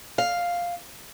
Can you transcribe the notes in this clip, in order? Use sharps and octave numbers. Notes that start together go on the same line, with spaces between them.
F5